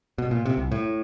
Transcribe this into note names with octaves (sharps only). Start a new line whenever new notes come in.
B2
A#2
C3
C2
A2